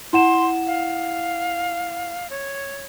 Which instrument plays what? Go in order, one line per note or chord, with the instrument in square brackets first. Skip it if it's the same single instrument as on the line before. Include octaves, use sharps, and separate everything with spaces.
[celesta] E4 F#5 E7 [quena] C6
[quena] F5
C#5